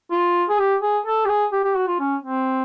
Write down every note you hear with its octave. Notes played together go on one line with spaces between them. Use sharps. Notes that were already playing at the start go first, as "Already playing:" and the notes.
F4
G#4
G4
G#4
A4
G4
G#4
G4
G4
F#4
F4
C#4
C4